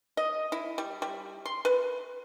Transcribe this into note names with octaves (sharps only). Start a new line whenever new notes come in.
D#5
E4
G3
G3
C6
B4